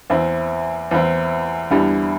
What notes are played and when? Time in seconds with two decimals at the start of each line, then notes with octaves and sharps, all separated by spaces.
0.10 E2 E3 C4 E4
0.91 E2 E3 C4 E4
1.70 E2 D3 G3 E4